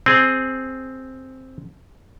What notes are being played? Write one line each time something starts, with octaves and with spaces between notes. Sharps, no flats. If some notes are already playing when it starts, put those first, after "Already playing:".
C4 G#4